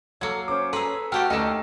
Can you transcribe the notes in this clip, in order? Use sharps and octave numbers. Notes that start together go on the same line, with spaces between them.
F#3 A#3 A4 C#5 G#6 C#7
C#4 C5 D6
G#4 A4 B4 A#5 C6 E6
A3 F#4 G4 A4 G5 A5 F6
D2 A#3 C#4 D#4 A4 D#5 E7